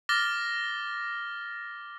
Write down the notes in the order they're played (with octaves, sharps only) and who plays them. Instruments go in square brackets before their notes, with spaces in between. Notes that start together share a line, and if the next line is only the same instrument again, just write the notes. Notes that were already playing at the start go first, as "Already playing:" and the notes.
[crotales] D6 F6 A6 A#6 G7